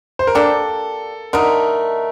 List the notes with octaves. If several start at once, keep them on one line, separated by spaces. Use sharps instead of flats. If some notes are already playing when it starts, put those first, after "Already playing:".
C5
A#4
A#3 D4 G4 A4
D3 A3 D#4 A#4